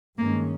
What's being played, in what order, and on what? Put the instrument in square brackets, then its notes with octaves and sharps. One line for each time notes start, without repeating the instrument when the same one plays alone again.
[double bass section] G2 D#3 G#3 C#4 [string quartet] A#3